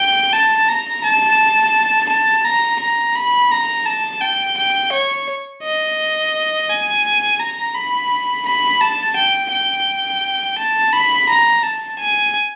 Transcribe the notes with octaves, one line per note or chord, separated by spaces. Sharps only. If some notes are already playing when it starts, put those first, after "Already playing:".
Already playing: G5
A5
A#5
A5
A5
A#5
A#5
B5
A#5
A5
G5
G5
C#5
D#5
G#5
A#5
B5
B5
A5
G5
G5
A5
B5
A#5
A5
G#5